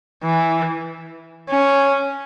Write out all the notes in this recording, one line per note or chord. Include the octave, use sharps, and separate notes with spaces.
E3
C#4